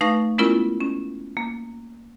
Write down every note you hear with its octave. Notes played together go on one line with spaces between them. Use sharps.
A3 D#4 B4 F5 C#6 A#6
G#3 B3 C#4 E4 F4 A#4
C#4
A#3